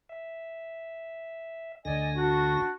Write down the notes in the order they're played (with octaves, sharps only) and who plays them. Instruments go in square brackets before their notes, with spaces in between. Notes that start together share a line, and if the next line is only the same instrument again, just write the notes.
[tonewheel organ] E5
[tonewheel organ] D2 D3 A#6 [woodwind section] D5 D#5 G#5
[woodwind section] D4 F#4